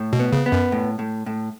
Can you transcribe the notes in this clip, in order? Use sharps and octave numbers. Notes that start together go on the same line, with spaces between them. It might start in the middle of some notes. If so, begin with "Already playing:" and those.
Already playing: A2
B2
B3
C#3
B3
F#2
A2
A2
A2